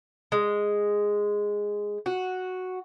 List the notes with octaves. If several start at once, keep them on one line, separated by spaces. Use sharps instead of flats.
G#3
F#4